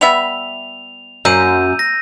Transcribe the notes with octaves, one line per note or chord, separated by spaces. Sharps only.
G3 B3 E5 F7
F#2 A#3 E6 G6 D#7
A#6